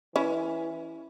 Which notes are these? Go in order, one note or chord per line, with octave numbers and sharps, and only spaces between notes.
E3 C#4 E4